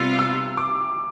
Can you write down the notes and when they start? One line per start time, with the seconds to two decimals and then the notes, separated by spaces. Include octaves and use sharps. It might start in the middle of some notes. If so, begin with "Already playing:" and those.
Already playing: C3 G3 B3 F4 E6
0.19 E6
0.57 D6